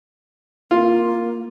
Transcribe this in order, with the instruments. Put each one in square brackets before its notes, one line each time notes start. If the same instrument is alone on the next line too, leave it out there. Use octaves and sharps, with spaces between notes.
[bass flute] A#3 [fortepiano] F4